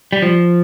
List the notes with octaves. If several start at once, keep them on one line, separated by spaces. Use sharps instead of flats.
G3
F3